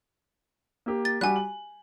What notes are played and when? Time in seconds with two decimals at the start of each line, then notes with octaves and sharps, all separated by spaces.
0.86 A#3 G4
1.05 A6
1.21 G3 F#4 G4 G#5 F#6
1.36 F#7